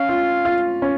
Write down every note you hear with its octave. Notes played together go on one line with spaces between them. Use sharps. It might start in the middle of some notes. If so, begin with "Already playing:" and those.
Already playing: C#4 F5
F4
F4
C#4